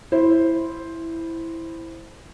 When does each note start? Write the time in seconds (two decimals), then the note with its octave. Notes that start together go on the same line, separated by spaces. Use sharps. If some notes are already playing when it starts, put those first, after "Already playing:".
0.12 E4 C5